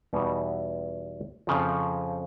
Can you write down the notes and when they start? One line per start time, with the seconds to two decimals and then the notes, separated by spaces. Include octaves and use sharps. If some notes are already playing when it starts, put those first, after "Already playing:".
0.13 E2 B2 G3 B3 D#4
1.47 F2 C#3 F3